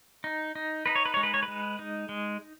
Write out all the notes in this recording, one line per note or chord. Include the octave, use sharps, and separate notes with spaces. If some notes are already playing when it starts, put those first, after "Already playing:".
D#4
D#4
D#4 B4
C#5
B4
G#3 C#5
B4
C#5
B4
G#3
D#4
G#3